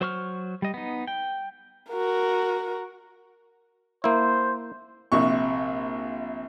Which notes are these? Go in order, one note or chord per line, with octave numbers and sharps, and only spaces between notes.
F#3 C5 C#6 F6
G3 D#5
B3 D#4
G5
F#4 A#4
A#3 E4 C5
A#1 C3 C#6